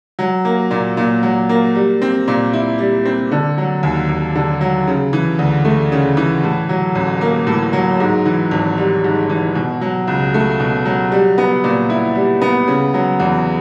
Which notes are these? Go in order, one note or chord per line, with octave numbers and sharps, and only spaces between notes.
F#3
A#3
A#2
A#2
F#3
A#3
G3
C4
A#2
E4
G3
C4
D3
F#3
D#2
D#2
D3
F#3
C#3
E3
D2
A3
C#3
E3
A2
F#3
A1
A#3
A2
F#3
G#2
E3
G#1
G3
G#2
E3
B2
F#3
C#2
A3
B2
F#3
G3
B3
A#2
E4
G3
B3
C#3
F#3
E2